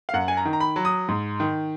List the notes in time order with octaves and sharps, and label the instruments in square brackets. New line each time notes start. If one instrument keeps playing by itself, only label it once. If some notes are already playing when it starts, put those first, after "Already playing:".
[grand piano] F5
F#2 F#5
G#5
A#5
D#3
A#5
B5
F#3
D#6
G#2
D#3